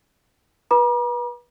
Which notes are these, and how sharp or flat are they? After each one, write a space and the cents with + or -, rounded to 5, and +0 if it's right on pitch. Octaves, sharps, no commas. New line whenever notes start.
B4 -25 A#5 +45 D6 +35